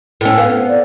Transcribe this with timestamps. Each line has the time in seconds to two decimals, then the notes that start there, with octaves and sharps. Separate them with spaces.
0.21 A2 C#4
0.38 B3 F5
0.68 D5